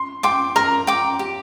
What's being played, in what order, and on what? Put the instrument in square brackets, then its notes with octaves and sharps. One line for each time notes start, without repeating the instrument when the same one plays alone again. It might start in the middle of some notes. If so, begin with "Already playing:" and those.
Already playing: [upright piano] C6
[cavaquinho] G5 D6 [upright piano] C6
[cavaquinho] A#4 [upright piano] A#5
[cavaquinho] G5 D6
G4